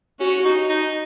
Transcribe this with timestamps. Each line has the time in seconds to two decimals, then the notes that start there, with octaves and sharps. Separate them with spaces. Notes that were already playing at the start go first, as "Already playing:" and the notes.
0.20 C#4 F#4
0.45 D#4
0.69 D#4